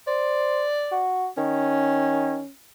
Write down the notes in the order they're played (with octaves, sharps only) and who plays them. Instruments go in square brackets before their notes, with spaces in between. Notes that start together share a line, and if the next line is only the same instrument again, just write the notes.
[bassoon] C5 [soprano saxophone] D5
[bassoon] F#4
[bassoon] D#3 [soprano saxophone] C#4